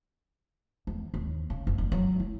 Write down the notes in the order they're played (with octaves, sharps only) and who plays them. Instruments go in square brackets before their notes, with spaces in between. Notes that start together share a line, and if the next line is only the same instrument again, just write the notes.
[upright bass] E2
D#2
C#3
F#1
E2
F#3
E4